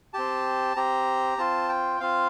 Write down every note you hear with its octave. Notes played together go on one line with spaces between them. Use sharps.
C4 G4 A5
C4 G4 A#5
C4 F4 A5
G5
C4 F4 F5